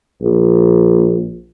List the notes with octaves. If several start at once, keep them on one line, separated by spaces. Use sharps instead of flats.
A#1